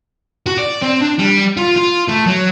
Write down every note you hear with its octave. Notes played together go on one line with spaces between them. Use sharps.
F#4
D5
C4
D4
G3
F4
F4
A3
F#3